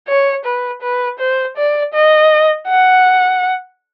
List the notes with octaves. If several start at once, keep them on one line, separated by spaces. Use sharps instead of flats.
C#5
B4
B4
C5
D5
D#5
F#5